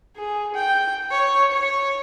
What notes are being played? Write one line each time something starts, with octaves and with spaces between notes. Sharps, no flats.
G#4
G5
C#5
C#5